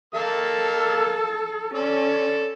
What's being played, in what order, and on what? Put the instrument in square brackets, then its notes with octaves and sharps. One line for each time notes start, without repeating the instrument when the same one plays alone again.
[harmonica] A#3 F5 E6 [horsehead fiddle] A4 A5
[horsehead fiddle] C#4 [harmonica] A4 D5